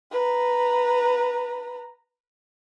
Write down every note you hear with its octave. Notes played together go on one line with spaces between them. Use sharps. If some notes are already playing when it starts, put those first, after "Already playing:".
B4 A#5